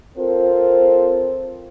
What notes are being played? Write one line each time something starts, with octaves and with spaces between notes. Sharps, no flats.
C4 F4 A4 A#4 C5